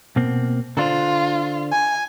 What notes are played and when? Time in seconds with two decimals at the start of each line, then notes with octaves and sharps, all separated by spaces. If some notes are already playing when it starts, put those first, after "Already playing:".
0.16 B2 A#3 C4
0.77 D3 D4 F4 C5
1.71 G#5